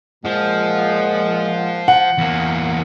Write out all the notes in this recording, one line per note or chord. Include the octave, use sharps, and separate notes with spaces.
A#2 F3 G#3 F#5
F#5
E2 A#3